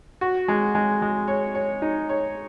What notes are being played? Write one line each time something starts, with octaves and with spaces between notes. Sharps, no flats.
F#4
G#3
G#3
G#3
C#5
C#5
D#4
C#5